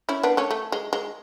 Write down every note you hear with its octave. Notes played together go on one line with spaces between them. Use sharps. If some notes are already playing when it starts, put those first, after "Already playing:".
C#4 E4
B3 D4
A3 C#4
A3
G#3
G#3